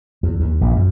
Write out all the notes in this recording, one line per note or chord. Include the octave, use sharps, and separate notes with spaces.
E2
D#2
A#1
F#2